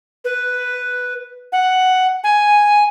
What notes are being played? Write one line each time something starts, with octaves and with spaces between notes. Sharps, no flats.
B4
F#5
G#5